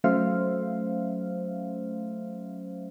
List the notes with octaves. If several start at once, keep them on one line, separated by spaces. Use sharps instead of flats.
F#3 A3 C#4 C5 E5 F5